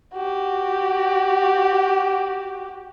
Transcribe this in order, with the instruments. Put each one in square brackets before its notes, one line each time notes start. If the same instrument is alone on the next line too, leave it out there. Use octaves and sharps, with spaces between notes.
[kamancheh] F#4 G4